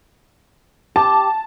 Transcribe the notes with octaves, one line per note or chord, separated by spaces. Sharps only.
G4 A5